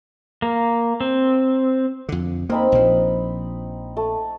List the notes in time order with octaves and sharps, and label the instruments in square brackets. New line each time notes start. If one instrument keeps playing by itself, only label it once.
[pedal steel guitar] A#3
C4
[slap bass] F2 D3
[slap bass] A#3 [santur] C4 D#4 B5
[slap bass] A#1 F3
[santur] A3